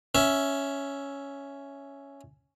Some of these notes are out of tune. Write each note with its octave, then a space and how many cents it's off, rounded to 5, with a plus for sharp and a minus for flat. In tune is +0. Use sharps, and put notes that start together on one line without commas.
C#4 +5 E5 +0